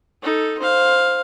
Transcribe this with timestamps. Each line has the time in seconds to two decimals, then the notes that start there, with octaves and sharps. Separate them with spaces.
0.23 D#4 A4
0.59 C5 F5